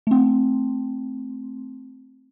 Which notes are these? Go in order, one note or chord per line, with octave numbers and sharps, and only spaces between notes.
A3 C4